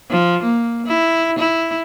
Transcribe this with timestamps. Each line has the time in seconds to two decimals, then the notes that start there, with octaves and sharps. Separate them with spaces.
0.10 F3
0.43 A#3
0.87 E4
1.38 E4